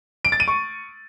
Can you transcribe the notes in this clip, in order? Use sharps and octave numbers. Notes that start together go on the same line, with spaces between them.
D7
A6
D#7
C#6